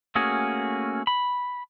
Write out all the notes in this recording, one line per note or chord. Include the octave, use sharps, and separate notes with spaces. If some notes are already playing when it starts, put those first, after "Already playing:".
A3 A#3 C#4 F#4 G#4
B5